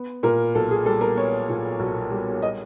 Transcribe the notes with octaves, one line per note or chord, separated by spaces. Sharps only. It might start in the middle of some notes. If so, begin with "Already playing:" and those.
Already playing: B3
A#2 A#4
B1 A4
G#4
G3 A4
A#4
B3 C#5
A#2
B1
G3
D#5